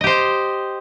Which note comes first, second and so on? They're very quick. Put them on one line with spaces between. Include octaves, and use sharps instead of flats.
D#5 G4 C5